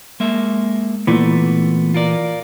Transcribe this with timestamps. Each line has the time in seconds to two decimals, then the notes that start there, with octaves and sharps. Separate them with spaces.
0.20 G#3 A#3 E5
1.07 A#2 E3 A3 B3
1.94 F4 A#4 D5